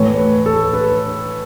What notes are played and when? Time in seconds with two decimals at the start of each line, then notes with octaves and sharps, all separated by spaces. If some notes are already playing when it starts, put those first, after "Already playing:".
Already playing: A2 E3 A3 C#5
0.18 B4
0.46 A4
0.73 B4